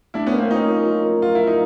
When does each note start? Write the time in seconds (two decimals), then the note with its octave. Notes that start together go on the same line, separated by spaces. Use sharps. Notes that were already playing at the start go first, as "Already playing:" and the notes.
0.14 A3 D4 E4
0.26 B3 C#4
0.33 A#4
0.38 A#3 C4
0.50 C#4 D#4 F4
0.68 A#4
0.86 F4
1.05 A#4
1.22 F4 A#4
1.35 E4
1.40 A#4
1.47 D#4